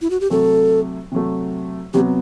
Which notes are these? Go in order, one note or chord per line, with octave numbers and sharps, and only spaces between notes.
E4
F#4
G4
C3 F#3 A3 A4
C3 F#3 A3
C3 F#3 B3 G4